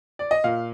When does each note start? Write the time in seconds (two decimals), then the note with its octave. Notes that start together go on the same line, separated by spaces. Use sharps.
0.19 D5
0.31 D#5
0.44 A#2 F5